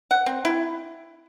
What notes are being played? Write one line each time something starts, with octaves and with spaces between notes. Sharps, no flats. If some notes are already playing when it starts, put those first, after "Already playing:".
F#5
C4
E4